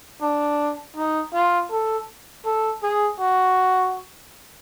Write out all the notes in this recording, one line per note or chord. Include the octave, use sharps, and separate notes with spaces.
D4
D#4
F4
A4
A4
G#4
F#4